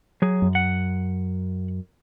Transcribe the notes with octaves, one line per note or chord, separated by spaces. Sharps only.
F#3 G#4
F#2
F#5